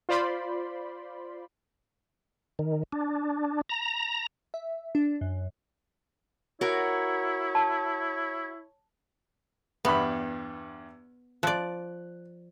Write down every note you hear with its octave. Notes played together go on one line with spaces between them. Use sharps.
F4 C5 D5 B5 C6
D#3
D4
A#5
E5
D4
F#2
E4 F#4 A#4 C#5
A5
E2 G2 B3 B5
F3 D5 F#6